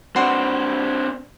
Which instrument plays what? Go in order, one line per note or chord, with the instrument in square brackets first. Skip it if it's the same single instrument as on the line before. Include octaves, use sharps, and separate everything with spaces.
[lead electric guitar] C4 D4 [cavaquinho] F#4 B4 C6